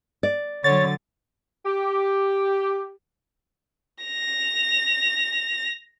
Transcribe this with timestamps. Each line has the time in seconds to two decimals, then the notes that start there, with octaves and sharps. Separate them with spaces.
0.23 D5
0.64 D3 F#3 C#5 A6
1.66 G4
4.04 A#6 F7